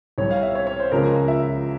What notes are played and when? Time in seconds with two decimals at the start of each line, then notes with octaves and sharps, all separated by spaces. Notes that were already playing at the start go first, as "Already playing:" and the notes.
0.18 C2 C3 G3 C#5
0.31 F5
0.43 E5
0.55 C#5
0.67 C#5
0.80 C5
0.92 C#2 C#3 F3 G#3 A#4
1.28 E5